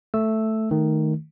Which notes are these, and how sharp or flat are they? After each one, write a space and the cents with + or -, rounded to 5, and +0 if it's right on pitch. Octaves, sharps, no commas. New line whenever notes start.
A3 +0 E6 +0
D#3 +0 A3 +0